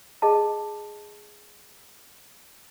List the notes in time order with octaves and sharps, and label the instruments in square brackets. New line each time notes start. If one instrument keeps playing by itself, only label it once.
[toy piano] G#4 D#5 A5